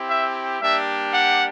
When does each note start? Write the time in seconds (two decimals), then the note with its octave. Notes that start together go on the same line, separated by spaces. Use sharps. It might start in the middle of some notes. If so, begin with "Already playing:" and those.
Already playing: C4 E4 G4
0.09 E5
0.61 G3 A#3 D4 G4 E5
1.14 F#5